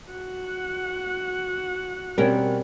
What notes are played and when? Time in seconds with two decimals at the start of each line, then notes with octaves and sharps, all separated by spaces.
0.12 F#4 F#5
2.18 B2 G3 C4 C#4 A#4